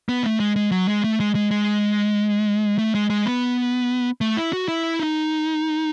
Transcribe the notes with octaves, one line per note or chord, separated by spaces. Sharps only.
B3
A3
G#3
G#3
F#3
G#3
A3
G#3
G#3
G#3
A3
G#3
G#3
B3
A3
E4
F#4
E4
D#4